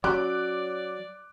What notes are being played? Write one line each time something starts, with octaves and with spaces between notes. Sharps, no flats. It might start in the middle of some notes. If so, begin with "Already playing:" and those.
F#3 C#4 D5 A#5 D6 F#6